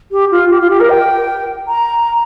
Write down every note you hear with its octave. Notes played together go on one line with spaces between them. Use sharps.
G4
F4
G4
F4
G4
A#4
G5
A#5